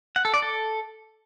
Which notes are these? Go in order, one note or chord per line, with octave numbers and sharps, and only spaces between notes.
F#5
A4
D5
A4